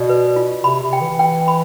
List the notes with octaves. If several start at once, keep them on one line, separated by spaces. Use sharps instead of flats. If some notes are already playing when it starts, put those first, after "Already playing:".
Already playing: B2 D5
B4
F4
C3 B5
C3
G5
E3
G5
B5